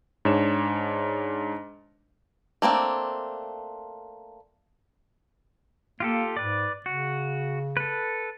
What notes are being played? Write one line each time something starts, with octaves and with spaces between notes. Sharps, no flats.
G#2 D4 C#5 E7
A3 A#3 C4 D4
A#3 F4 G4 A4
G#2 B4 D5
C#3 F#4
A4 B4